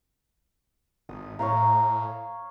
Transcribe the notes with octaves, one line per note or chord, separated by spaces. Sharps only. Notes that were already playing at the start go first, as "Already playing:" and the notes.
G#1 D#6
A2 C#5 F5 A#5